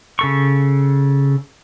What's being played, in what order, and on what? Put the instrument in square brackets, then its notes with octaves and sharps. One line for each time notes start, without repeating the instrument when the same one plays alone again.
[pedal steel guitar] C#3 A4 C#6